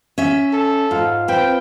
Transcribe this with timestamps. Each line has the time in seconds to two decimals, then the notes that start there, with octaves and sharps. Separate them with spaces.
0.18 C#4 E5
0.53 A4
0.91 G#2 F4
1.28 C4 B4 G5